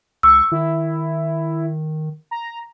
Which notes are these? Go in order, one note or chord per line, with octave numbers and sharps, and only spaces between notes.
C#2 C#6 E6
D#3 E4
A#5